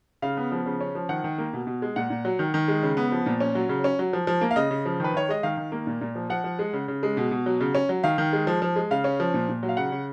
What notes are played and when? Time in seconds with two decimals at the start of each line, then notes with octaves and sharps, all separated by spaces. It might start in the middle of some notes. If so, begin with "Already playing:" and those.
0.22 C#3 F5
0.37 B3
0.52 F3
0.66 C#3
0.81 C#4
0.95 F3
1.09 D#3 F#5
1.24 D#3
1.38 A#3
1.53 B2
1.67 B2
1.82 G#3
1.96 A#2 F#5
2.10 A#2
2.25 F#3
2.39 D#3
2.54 D#3
2.68 G#3
2.83 C#3
2.97 B3
3.12 F3
3.26 A#2
3.40 C#4
3.55 F#3
3.69 C#3
3.84 C#4
3.99 F#3
4.13 F3
4.27 F3
4.41 A#3
4.51 F5
4.56 C#3 D#5
4.71 C#3
4.86 F3
5.00 D#3 B4
5.14 D#3 C#5
5.29 G#3 D#5
5.43 D#3 F5
5.57 D#3
5.72 A#3
5.87 A#2
6.01 A#2
6.15 F3
6.30 F3 F#5
6.44 F3
6.59 G#3
6.73 C#3
6.88 C#3
7.03 G#3
7.17 B2
7.31 B2
7.46 F#3
7.61 C#3
7.75 C#4
7.89 F#3
8.04 D#3 F5
8.18 D#3
8.33 G#3
8.47 F3
8.62 F3
8.76 G#3
8.91 C#3 F5
9.04 C#4
9.20 F3
9.34 A#2
9.49 A#2
9.63 F#3
9.69 F5
9.77 C#3 F#5
9.92 C#3